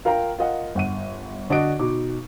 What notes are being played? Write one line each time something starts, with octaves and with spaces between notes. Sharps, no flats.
F4 A#4 F5 G5 A#5
F4 A#4 D#5 F5 F#5
G1 F#5 D#7
D3 D4 F#4 D5 D#5 D7
B2 D#4 D6